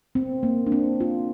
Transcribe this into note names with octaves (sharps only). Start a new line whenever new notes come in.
C4
A#3
D4
C4
F4